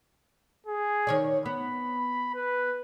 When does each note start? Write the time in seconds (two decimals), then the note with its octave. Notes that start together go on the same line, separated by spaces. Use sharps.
0.67 G#4
1.07 D#3 C#5 D5
1.46 B3 B5
2.34 B4